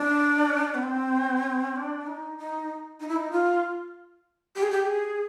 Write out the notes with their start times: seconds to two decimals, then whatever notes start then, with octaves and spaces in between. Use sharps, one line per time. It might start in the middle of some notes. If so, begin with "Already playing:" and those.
Already playing: D4
0.74 B3
0.83 C4
1.76 D4
2.07 D#4
2.38 D#4
3.00 D#4
3.09 E4
3.16 D#4
3.31 F4
4.56 G4
4.63 G#4
4.71 G4
4.86 G#4